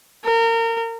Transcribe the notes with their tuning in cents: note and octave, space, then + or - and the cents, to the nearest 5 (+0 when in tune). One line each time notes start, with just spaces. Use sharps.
A#4 -30